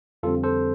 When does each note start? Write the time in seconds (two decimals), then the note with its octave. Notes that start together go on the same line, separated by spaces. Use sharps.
0.23 F2 D3 G3 C4 F4 A4
0.43 A4 C5